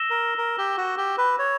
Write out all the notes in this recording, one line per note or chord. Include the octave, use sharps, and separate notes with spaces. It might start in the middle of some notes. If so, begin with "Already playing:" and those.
Already playing: E6 A#6 E7 G7
A#4
A#4
G4
F#4
G4
B4
C#5